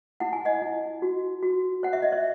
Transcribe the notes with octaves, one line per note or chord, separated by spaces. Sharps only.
E4 F#5
G#5
D#5 F#5
E4
F#4
F#4
C#5 F#5
E5
D#5
C#5 E5